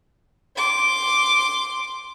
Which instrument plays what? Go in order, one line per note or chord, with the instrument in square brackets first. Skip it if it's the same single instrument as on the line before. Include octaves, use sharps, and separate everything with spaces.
[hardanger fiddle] C6 D6